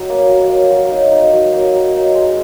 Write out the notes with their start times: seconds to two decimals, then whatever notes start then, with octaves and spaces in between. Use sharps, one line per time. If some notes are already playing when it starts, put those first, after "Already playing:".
Already playing: F#3 D#4
0.10 A#3
0.30 F#3
0.50 A#3
0.71 F#3
0.91 D#4
1.12 D#4
1.33 F#3
1.53 A#3
1.74 F#3
1.94 D#4
2.15 G#3